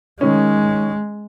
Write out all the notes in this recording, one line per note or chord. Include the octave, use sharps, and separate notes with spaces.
D#3 G#3 C#4